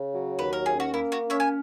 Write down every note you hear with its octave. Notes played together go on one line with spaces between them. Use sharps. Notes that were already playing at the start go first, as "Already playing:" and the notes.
Already playing: C#3
F#3
D#2 B4
A#4
C#4 G#4
F#4
A#3 E4
F#4
C#4
C#5 E5
G#5